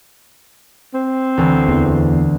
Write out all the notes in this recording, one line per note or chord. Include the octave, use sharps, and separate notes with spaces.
C4
D2 E3
E2